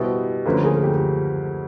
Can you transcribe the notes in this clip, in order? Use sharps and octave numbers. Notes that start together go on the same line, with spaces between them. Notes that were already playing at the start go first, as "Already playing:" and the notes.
Already playing: B2 G3 B3 E4 A#4 C5
D2 D3 F3 A#3 C#4 A4 B4
G#4 A#4
G4 A4